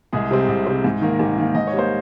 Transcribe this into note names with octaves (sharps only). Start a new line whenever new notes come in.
C2 G#3 G#4
C3 G3 C4
C2
C3 G3 C4
G#2
D#3 A#3
G#2 G3 G4
D#3 A#3
G#2 D#5
C#5
G3 A#3 C5